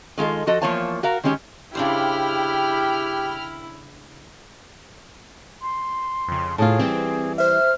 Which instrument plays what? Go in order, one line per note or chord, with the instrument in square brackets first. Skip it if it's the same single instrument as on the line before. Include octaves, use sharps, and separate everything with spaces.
[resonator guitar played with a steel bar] D#3 G#3 F4 A4
F3 F#4 A4 D#5
E2 F3 A#3 C#5 F5 A5
F#4 A#4 F5
D#3 G#3 C#4 F4 G4
[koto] C#3 D4 C5 [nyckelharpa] E4 [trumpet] G4 [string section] G5 B5 F6
[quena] C6
[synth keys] F2 C#3
[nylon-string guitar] A2 F4 [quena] G#4 [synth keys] A5
[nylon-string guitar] E3 G3 [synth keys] C4
[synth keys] C5 E5 [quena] F6